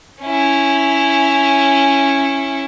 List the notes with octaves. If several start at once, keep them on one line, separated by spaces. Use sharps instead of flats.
C#4 E4